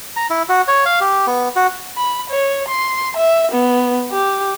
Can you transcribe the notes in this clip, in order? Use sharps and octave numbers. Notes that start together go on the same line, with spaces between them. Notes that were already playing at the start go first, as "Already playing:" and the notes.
A#5
E4
F#4
C#5
F5
G4
B3
F#4
B5
C#5
C6
E5
B3
G4